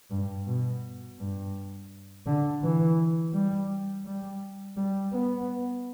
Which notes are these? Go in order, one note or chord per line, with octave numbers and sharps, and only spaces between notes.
G2
B2
G2
D3
E3
G3
G3
G3
B3